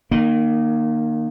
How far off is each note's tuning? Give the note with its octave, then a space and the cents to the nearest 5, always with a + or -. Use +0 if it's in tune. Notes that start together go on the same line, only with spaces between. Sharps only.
D#3 -25 A#3 +0